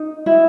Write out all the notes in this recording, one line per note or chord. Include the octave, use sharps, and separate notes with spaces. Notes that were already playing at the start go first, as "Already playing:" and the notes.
Already playing: D#4
E4